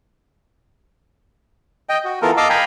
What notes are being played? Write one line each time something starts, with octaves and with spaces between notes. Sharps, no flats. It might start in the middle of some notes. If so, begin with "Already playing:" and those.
D#5 G5
F#4
E3 B3 F4 A4 A#4
D#5 F5 A5 D6 E6
F5 G5 G#5 A#5 B5